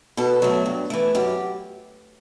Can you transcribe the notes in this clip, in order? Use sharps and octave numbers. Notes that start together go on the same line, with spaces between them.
B2 A4
F#3 A3
G2
E3 A3
F#2 G4